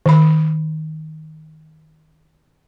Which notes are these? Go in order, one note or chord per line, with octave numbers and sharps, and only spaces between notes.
D#3 B5